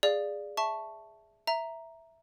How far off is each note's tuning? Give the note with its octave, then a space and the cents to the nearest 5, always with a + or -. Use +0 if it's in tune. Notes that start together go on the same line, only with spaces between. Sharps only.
G#4 -10 D5 +0 F5 +0
E5 -5 A5 +0 C#6 -5
E5 +0 A#5 +0